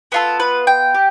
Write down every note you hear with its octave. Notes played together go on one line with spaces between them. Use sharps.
B3 F4 A4
B4
G5
G4